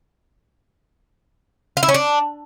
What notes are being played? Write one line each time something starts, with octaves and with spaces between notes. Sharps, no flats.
F4
E4
C#4
D4